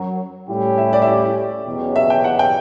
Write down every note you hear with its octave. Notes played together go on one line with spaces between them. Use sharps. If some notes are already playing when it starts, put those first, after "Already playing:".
Already playing: F#2 F#3
A2 G3 C#4 E4 G4
E5
D5
E5
D5
E2 B2 F#3 C#4 G4
E5
G5
F#5
G5